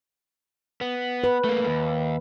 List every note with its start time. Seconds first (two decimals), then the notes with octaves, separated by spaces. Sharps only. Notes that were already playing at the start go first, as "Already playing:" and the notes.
0.81 B3
1.24 B4
1.44 A3 A#3
1.66 D#2